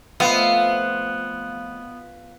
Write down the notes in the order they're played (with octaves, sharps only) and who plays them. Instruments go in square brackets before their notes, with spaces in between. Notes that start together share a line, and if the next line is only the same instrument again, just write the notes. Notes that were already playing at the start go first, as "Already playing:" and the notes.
[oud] F3 A3 C4 [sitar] B3 [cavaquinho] F4 [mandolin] D#5 F5